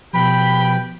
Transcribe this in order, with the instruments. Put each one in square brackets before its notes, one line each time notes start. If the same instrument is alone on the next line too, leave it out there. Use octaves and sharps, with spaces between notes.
[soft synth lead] B2 [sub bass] F3 [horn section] G4 B4 G5 [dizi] B5